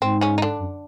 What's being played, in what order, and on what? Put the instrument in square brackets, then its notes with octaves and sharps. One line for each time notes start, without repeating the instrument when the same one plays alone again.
[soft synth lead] G#2 [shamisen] C4
[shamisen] C#3 C#4
D#4
D3 D4
[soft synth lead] F#2